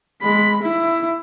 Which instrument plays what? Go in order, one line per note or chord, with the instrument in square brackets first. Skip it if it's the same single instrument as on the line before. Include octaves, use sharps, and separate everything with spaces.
[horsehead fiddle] G#3 B5
E4